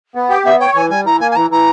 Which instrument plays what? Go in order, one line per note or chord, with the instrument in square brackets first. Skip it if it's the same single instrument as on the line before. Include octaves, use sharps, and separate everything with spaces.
[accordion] B3
[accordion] G4 [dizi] G5
[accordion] B3 [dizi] E5
[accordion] C#5 [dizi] G5
[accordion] E3 [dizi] G#5
[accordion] G3 [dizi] G#5
[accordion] E3 [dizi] A#5
[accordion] A#3 [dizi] G#5
[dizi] G#5
[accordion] E3 [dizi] A#5
[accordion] E3 [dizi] A#5